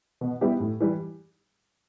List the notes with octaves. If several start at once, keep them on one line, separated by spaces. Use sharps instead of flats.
B2
G3 B3 E4 G4
A2
E3 G3